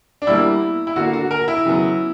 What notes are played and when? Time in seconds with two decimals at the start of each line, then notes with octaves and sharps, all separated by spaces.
0.22 D4
0.27 B2 G3 A#3 E4
0.87 E4
0.96 D3 A#3 F#4
1.13 F#4
1.31 A#4
1.48 E4
1.65 C#3 F#3 B3